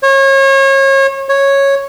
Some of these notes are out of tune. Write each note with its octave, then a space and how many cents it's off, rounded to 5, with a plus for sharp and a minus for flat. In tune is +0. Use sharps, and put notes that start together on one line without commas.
C#5 -30
C#5 -5